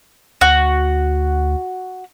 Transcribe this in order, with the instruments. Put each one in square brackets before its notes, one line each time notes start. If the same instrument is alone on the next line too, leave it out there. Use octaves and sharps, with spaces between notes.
[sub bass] D2 [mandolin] F#4